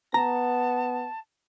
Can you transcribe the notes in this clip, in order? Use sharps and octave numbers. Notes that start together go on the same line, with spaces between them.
B3 A5 A#5